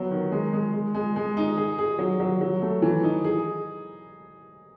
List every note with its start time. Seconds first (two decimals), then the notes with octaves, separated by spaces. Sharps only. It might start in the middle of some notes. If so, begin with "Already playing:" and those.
Already playing: F#3 B3
0.11 D#3
0.32 G#3
0.53 G#3
0.73 G#3
0.95 G#3
1.16 G#3
1.37 D#4
1.57 G#4
1.79 G#4
1.99 F#3
2.20 F#3
2.41 F#3
2.62 A3
2.82 E3
3.03 D#4
3.24 G#4